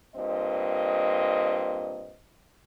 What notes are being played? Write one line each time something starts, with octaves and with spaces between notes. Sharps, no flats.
G2 A#2 C4 D#5